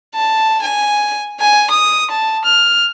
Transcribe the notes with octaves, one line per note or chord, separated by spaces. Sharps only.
A5
G#5
G#5
D#6
A5
F6